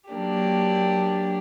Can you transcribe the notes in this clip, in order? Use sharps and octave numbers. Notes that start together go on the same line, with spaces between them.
F#3 A#3 D4 G4